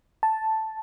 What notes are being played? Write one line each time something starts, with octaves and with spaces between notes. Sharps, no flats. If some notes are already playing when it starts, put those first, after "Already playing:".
A5